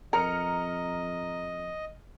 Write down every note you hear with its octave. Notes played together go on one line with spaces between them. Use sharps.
F2 A#4 D#5 A#5 F6 C#7